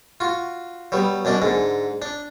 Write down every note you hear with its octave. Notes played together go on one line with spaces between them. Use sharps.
F4 F#4
F#3 G3 B3
F#2 B2 D4 D5
G#2 D3
D4